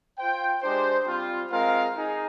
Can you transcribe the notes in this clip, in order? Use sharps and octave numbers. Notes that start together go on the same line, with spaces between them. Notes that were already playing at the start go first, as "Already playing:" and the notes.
F4 C5 G5
G#3 D4 G4 C5
G3 C4 F4
G#3 C4 F4 A#4 F5
D#4 G#4